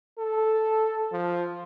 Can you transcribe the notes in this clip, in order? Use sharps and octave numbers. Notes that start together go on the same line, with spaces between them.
A4
F3